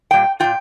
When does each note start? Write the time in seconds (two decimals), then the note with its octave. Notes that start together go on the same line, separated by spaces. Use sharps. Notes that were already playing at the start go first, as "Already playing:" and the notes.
0.11 A#2 G3 G5
0.40 A#2 A#3 F4 G5